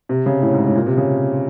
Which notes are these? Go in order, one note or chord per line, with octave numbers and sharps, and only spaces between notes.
C3
C#3
A2
G#2
G#2
A#2
C3
C#3